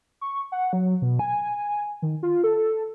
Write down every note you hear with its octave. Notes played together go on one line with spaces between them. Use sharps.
C#6
F#5
F#3
B2
G#5
D#3
F4
A4